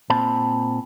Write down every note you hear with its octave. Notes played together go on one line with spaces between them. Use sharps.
A#2 C4 A5 B5